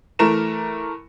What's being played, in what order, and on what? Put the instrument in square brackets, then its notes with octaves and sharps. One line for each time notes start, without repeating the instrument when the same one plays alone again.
[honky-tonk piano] E3 A3 A#4 A#5 E7